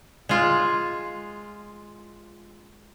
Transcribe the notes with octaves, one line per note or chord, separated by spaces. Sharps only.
G#3 F4